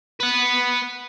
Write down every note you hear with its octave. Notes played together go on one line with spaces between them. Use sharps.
B4 F#5